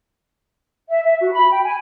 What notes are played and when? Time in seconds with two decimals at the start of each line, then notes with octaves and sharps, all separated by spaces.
0.89 E5
1.03 E5
1.20 F#4
1.33 B5
1.50 G5
1.64 G#5